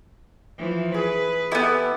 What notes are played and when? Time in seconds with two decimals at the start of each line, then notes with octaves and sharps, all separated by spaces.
0.58 E3 F3
0.94 G#4 B4
1.52 B3 E4 G4 A4 E5